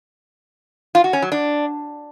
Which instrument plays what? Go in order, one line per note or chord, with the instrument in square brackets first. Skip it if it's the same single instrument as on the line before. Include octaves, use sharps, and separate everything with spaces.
[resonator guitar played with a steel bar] F4
F#4
C#4
F#3
D4